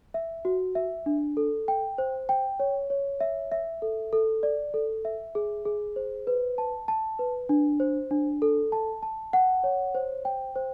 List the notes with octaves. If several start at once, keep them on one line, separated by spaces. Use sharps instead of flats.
E5
F#4
E5
D4
A4
G5
C5
G5
C#5
C#5
E5
E5
A4
A4
D5
A4
E5
G#4
G#4
C5
B4
A5
A5
B4
D4
C5
D4
A4
A5
A5
F#5
C#5
C5
G5
C5